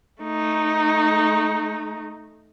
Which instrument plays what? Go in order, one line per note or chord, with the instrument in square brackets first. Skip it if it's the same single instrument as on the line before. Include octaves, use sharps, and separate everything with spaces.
[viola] A3 D#4